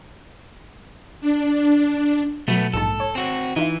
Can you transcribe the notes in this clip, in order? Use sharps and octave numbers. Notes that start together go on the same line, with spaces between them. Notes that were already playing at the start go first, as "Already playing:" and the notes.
D4
B2 F#3 A3 B3
A#1 G#2 A4 A5
C#5
C4 F#4
E3 D#4 F4 E5